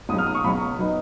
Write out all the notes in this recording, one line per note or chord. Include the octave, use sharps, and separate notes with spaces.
C#2 B2 F#3 D#6
F6
D#6
C#6
C#2 B2 F#3 B5
F#3 B3 D#4